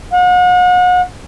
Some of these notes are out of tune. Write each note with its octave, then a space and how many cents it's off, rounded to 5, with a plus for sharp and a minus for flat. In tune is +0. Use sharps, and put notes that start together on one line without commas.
F#5 -40